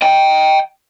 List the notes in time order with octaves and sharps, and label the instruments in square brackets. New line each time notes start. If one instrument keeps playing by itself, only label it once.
[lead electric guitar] D#5 G5